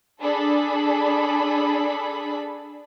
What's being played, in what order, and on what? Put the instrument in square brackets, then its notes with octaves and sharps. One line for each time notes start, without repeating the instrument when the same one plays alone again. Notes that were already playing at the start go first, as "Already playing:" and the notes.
[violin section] D4 G#4 A4 B5